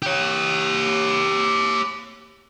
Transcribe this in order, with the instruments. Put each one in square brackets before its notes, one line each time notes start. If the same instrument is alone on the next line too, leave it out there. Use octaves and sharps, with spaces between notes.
[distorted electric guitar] G4 C#5